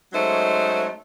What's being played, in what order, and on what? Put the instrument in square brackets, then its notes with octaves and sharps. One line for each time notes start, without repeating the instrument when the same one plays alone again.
[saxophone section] F#3 G#3 A3 C#4 D#4 C5